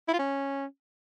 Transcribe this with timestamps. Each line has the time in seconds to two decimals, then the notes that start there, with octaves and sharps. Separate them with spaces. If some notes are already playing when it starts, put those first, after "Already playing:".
0.08 E4
0.13 F4
0.19 C#4